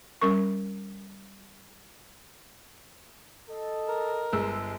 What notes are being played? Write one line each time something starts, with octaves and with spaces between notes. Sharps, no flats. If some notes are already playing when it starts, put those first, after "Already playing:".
G3 C#4 A#4 C#6
A4 D#5
A#4
G1 G#3 E6